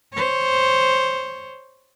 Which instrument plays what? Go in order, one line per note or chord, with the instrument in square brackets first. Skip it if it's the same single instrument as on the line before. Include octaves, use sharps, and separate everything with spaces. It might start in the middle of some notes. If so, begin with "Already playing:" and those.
[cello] C5 C#5